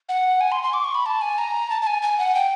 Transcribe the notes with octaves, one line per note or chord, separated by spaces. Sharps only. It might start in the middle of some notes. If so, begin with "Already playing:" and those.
F#5
G#5
C6
C6
D6
C#6
B5
A5
G#5
A#5
A5
A5
G#5
G#5
F#5
G5